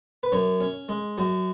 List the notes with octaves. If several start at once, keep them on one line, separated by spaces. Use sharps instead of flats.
B4
F#2 C#5
C#4
G#3
F#2 F#4